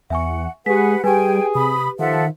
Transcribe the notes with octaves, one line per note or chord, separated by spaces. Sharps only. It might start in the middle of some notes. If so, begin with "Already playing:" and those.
E2 E5 F#5 G#5 C#6
G#3 G4 G#4 B4 F#5 B6
G3 G4 G#4 B4 G5 G#5
C3 B5 D#6
D#3 F3 A4 E5 F#5